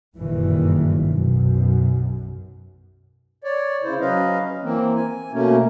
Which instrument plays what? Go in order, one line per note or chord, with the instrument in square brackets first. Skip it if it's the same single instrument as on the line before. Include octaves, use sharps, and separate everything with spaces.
[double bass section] F#1 G2 A#2 D#3 E3
B1 F#2
[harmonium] C#5 D5
C#3 E4 C5
F#3 C#4 B4 D#5 F5
E3 A#3 C4
G#5
B2 A3 A#3 C#4